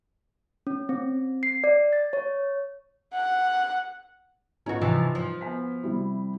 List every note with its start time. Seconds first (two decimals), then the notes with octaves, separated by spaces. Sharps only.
0.67 C#4
0.89 C4
1.43 C7
1.64 D5
1.93 A6
2.13 C#5
3.13 F#5
4.66 C#4 D#4 F4 F#4 B4
4.81 C3 E3 F3
5.15 F3
5.41 B3 G#5 B6
5.83 C3 G3 E4